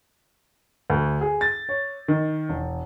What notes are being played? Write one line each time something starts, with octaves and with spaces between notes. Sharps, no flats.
D2
G#4
A6
C#5
D#3
E1